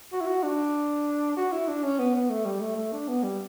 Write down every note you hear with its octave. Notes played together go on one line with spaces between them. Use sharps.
F#4
E4
F#4
D4
F#4
E4
D4
C#4
B3
B3
A3
G3
A3
A3
D4
B3
G3